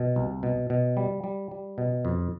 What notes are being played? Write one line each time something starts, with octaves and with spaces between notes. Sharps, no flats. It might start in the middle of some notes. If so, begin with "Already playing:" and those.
Already playing: B2
C2
B2
B2
G3
G3
G3
B2
F2